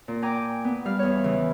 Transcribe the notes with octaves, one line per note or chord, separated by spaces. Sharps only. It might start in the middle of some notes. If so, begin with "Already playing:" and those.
A#2
G5 G#5 A#5 D6
B3
G3 F5 F6
E2 C#5
C#3 E3